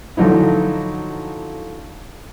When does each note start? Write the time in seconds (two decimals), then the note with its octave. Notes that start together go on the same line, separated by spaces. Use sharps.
0.17 D3 F3 F#3 D#4 E4